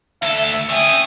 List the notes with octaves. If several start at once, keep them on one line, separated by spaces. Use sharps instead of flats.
D2 A4 E5
C#4 G5 G#5 D#6